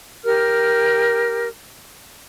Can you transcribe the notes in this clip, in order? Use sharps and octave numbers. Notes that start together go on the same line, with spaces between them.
G4 A#4 F6